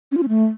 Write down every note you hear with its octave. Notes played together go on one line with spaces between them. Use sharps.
C#4
F4
C#4
A3